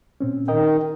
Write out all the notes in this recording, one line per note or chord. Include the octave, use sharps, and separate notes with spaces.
A#2 C4 C#4
D#3 A#4 D#5 G5